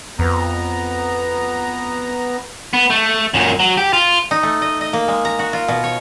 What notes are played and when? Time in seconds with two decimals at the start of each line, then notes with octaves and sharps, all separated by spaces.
0.19 F2 B3 A#5
2.73 B3
2.90 A3
3.34 F#2 A#2
3.60 F#3
3.78 G4
3.93 F4
4.31 D#4
4.43 A3
4.62 D#5
4.81 D#5
4.93 A#3
5.08 G#3
5.25 A#5
5.39 F#4
5.53 F4
5.68 B2
5.84 C#5